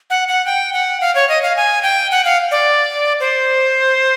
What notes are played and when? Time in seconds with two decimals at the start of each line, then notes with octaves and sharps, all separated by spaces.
0.10 F#5
0.28 F#5
0.46 G5
0.73 F#5
1.01 F5
1.15 C#5
1.29 D#5
1.43 F5
1.57 G#5
1.83 G5
2.11 F#5
2.25 F5
2.51 D5
3.20 C5